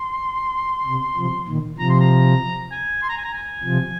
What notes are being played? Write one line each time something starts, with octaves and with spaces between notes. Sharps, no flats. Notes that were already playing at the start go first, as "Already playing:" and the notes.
Already playing: C6
C3
C3 F3
A#2 D#3
C3 F3 A#5
C6
A#5
G#5
C6
A#5
G#5
A#5
G#5
C3 F3